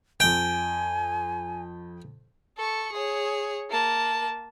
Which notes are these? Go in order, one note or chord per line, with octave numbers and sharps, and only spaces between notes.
F2 G5 G#5 D7
A4 C#6
G#4 C#5
A#3 A5